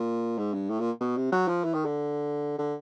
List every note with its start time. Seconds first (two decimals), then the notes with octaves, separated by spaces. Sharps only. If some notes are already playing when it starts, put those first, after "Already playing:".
Already playing: A#2
0.38 G#2
0.54 G2
0.69 A2
0.80 A#2
1.01 B2
1.17 C3
1.32 F#3
1.48 F3
1.64 E3
1.74 D#3
1.85 D3
2.58 D3